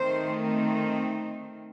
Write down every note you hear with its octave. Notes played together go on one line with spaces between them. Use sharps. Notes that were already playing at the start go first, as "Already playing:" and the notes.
Already playing: D#3 A3 C4 D#4 C5